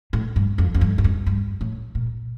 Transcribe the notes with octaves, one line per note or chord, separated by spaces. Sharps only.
A2
G2
F2
F2
G2
G2
F2
G2
A2
A#2